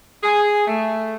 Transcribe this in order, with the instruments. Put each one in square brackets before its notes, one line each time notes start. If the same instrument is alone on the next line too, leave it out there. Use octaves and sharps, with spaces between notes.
[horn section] G#4
A3